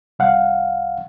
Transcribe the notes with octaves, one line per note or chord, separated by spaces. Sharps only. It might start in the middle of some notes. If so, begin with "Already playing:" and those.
C2 F5 F#5